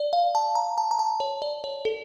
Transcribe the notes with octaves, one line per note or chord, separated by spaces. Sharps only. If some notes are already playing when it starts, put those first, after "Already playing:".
Already playing: D5
F5
A5
A#5
A5
A#5
A5
C#5
D5
C#5
A4